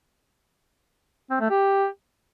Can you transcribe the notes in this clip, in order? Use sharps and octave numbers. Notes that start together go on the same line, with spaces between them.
C4
A3
G4